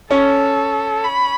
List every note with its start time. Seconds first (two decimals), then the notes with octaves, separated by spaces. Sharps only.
0.11 C#4 A4 C#5
1.04 B5